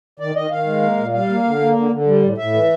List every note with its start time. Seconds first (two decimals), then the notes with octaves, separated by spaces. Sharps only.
0.20 D#3 D5
0.35 D#3 D#5
0.51 D#3 F5
0.66 G#3
0.82 A#3
0.97 A#2
1.13 G3 F5
1.29 A#3
1.44 D3
1.60 A#3
1.76 D3
1.91 D3
2.07 G3
2.23 A2
2.38 A2 E5
2.54 E3